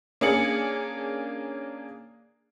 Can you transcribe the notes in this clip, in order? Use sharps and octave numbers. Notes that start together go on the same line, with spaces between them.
A#3 C#4 D4 G#4 C#7 F#7